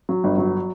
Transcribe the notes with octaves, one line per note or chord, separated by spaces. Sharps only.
F#3
G1
F#3